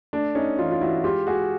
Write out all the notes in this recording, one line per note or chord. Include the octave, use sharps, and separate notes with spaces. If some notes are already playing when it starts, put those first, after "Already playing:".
A3 D4
A3 C#4 D#4
E3 D#4 F4
F4
E3 E4 F#4
G#3 F4 G4
G#3 F#4 G#4